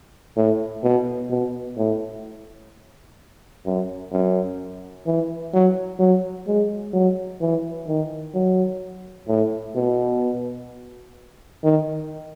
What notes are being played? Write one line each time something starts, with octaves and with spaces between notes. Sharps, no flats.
A2
B2
B2
A2
F#2
F#2
E3
F#3
F#3
G#3
F#3
E3
D#3
F#3
A2
B2
D#3